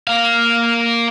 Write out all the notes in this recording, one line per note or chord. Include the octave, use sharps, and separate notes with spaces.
A#3 F5